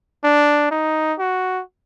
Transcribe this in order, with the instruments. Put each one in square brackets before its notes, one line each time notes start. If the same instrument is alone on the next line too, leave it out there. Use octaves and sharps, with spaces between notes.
[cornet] D4
D#4
F#4